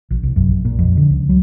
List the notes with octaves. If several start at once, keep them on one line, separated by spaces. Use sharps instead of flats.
A#1
C2
F#2
A#1
A#2
F2
D3
C#2
F#3